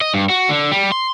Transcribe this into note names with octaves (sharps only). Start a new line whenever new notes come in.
D#5
G2
F#4
D3
G3
C6